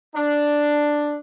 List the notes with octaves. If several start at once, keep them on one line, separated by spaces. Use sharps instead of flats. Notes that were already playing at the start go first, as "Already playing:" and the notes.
D4